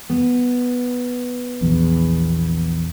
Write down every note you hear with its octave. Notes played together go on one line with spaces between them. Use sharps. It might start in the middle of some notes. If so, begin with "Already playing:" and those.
B3
A#1 E2